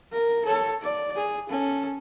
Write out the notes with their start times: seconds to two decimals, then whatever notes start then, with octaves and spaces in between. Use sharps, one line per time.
0.12 A#4
0.46 A4 C#5
0.82 D5
1.16 G#4
1.50 C#4 A4